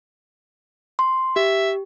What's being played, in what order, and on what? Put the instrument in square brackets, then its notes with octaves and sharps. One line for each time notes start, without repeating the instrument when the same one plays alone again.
[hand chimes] C6
[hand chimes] G4 [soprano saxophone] E5